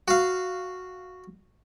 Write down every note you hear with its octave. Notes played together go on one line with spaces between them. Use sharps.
F#4 F5